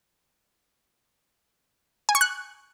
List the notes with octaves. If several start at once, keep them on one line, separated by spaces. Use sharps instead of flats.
G#5
C#6
F#6